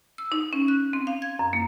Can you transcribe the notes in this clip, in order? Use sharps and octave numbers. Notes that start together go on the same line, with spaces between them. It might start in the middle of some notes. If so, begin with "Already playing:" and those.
E6
D#4
C#4
F#6
C4
F5
G#6
F#2
A#3